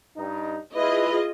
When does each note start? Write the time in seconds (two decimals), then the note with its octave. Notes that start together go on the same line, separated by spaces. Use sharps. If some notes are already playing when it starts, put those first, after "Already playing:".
0.17 G2 D#4
0.75 E4 F4 G#4 B4 D#5